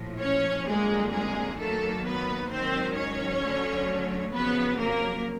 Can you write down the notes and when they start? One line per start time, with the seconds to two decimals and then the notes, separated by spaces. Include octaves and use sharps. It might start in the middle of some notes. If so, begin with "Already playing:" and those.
Already playing: A#1 A2 F3
0.20 C#4 C#5
0.67 F2 D3 G3 G#3 A#3 G#4
1.12 G#3 G#4
1.58 F#2 D#3 F#3 A3 A#3 A4
2.04 B3 B4
2.50 G#2 D#3 F#3 C4 C5
2.96 C#4 C#5
3.42 D2 D3 F#3 A3
4.33 F2 C#3 F#3 B3 B4
4.79 A#3 A#4